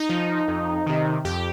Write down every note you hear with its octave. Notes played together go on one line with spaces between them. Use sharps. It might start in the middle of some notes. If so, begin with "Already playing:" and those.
Already playing: D#4
F3
F2
C3 D#3
F2 G4